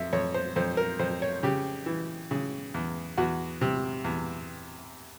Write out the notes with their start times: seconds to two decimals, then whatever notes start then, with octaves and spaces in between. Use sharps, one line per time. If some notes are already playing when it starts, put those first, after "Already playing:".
Already playing: F2 E5
0.13 F2 C#5
0.34 C5
0.56 F2 C5
0.77 A#4
0.99 F2 C5
1.22 C#5
1.43 C#3 G4
1.86 E3
2.31 C#3
2.74 E2
3.18 E2 F#4
3.61 C3
4.04 E2